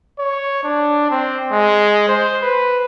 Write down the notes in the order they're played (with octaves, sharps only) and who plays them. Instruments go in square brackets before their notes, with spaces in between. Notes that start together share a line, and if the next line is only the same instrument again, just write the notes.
[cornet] C#5
D4
C4
G#3
C5
B4